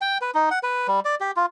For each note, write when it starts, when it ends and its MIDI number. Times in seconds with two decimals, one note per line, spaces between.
0.01 0.18 79
0.21 0.31 71
0.35 0.49 63
0.51 0.59 78
0.63 0.87 71
0.88 1.00 55
1.05 1.15 74
1.21 1.31 67
1.36 1.46 65